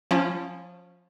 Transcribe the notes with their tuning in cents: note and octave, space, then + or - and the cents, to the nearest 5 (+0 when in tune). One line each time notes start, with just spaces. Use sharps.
F3 +20 C#4 -10 F4 -45